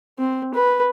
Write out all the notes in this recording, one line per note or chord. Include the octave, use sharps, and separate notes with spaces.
C4
B4